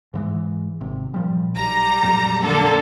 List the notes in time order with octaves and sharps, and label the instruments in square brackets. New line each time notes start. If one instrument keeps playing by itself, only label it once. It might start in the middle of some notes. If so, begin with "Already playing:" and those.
[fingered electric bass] G#2 E3 G#3
G#1 C3
A#2 F3 G3
[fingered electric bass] B1 [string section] G3 A#5
[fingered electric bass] F2 A#2 F#3
[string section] D3 A#3 A4